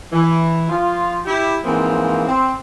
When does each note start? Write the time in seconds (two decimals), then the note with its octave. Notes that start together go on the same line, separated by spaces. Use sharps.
0.11 E3
0.69 F3 F4
1.24 E4 G4
1.64 G#2 E3 F3 A#3 C4
2.27 C4